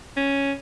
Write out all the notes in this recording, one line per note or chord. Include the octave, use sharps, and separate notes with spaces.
C#4